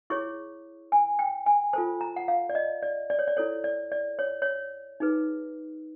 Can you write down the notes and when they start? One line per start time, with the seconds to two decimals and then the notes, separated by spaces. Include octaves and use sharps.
0.10 E4 G#4 C#5 C#6
0.92 G#5
1.19 G5
1.46 G#5
1.73 F4 A4 C5 A5
2.01 A#5
2.16 F#5
2.28 F5
2.49 D5
2.55 D#5
2.83 D5
3.10 D5
3.19 C#5
3.27 D5
3.37 E4 A4 C#5
3.64 D5
3.92 D5
4.19 C#5
4.42 C#5
5.00 D#4 G#4 B4